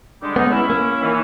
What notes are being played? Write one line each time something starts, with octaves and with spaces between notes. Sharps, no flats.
D3 G3 G#3
G#3 B3 C#4 D#4
C#4 E4
A#3
D#3 E3 C#4